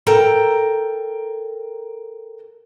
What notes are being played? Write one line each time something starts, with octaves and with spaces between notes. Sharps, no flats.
A4 A#4 G5 A#5